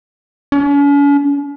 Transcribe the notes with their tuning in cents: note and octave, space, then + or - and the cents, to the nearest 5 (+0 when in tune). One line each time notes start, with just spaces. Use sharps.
C#4 +45